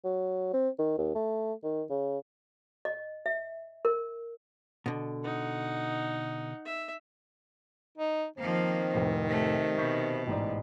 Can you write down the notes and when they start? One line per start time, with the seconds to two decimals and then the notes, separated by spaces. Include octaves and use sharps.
0.05 F#3
0.54 C4
0.79 D#3
0.98 D#2
1.15 A3
1.64 D#3
1.90 C#3
2.85 D#5
3.26 E5
3.85 A#4
4.86 B2 D3
5.24 D#4 F#5
6.65 E5
7.98 D#4
8.37 D#3 F3 A#3 C4
8.94 F1 A2
9.29 C3 A3
9.77 B2 C#6 G6 B6
10.27 A1 G#2 D#4 D5